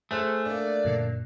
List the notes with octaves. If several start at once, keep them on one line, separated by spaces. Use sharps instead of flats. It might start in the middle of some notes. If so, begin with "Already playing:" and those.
A3 G#4 C5 F#6
A#3 D4 D5
F#2 A#2 D3